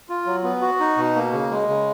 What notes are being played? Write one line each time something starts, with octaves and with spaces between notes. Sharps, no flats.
F4
F#3
B3
F#4
D#4
B2
A#3
C#3
G#3
C#3